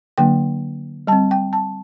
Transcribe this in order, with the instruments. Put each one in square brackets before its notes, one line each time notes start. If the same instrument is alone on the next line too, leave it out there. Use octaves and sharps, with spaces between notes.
[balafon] D3 F#3 A#3 D4 G5
G3 C4 A5
G5
A5